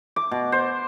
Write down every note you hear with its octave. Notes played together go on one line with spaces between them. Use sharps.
D6
B2
C5